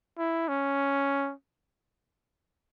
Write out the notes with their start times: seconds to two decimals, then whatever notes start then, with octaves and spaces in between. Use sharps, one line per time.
0.19 E4
0.49 C#4